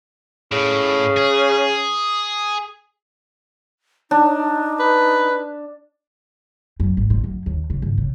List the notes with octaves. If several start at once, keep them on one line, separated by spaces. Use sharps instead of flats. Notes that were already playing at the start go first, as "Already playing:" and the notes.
A2 C#3
G#4
D4 D#4
B4
F#2
G#1
A#2
F#2
D#2
C#3
G#1
C#3